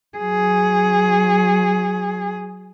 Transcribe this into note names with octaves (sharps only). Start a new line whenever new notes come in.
F#3 G#4